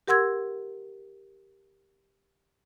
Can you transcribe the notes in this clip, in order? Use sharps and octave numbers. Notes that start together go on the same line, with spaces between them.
G4 A#4 F#5 C6 E6 G#6